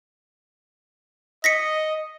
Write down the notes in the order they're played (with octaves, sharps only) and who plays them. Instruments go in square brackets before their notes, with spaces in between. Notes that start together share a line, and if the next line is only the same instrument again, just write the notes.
[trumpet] D#5 [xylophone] A#6 B6 C#7